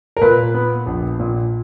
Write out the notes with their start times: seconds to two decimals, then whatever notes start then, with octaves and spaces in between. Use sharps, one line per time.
0.17 A#4
0.21 A#2 B4
0.54 B3
0.86 A#1
1.20 A#2